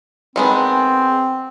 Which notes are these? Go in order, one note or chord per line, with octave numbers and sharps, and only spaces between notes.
D#3 G#3 B3 C4